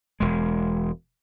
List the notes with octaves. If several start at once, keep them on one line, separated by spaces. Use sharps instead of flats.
E1 G#3